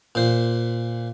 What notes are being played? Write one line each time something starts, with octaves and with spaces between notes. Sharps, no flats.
A#2 C5